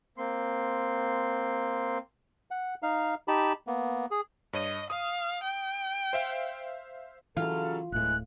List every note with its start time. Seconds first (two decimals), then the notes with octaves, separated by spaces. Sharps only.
0.18 A#3 C4 C6
2.51 F#5
2.83 D#4 F5
3.28 D#4 G4 A5 B5
3.67 A#3 B3
4.11 G#4
4.53 G2 C#5 D#5 D#7
4.90 F5 D#6
5.43 G5
6.13 C5 E5 F5
7.37 C#3 E3 F#3 F4 A4 F6
7.92 D1 A2 E3 G#3 F#6